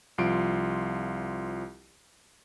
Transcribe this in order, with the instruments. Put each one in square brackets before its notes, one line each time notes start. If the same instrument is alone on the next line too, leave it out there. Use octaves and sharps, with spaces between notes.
[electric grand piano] C2 F3 F4 C6 D7